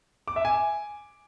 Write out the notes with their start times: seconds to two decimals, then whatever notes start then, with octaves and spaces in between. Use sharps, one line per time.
0.28 D6
0.36 E5
0.45 G#5